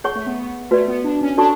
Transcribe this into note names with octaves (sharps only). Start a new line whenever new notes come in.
G#4 C#5 F#5 C#6
A3
B3
B3
A3 F#4 B4 D5
B3
D4
C#4
D4 F#4 A4 D5 A5 C#6